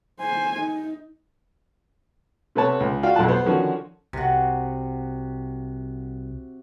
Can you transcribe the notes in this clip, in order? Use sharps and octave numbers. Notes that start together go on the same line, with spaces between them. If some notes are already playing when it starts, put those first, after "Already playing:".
C5 G#5
D#4
C3 A3 B3 B4 C#5 A5
C#2
D4 F4 F#4 F5 G5
B1 F2 A2 F4 A5 F#6
B3 B4 C5
D3 D#3 F3 C#4 F#4
C2 C3 F#4